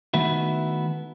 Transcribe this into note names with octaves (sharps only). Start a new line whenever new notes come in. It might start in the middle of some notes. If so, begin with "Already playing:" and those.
D#3 A3 B3 D#4 E4 F#4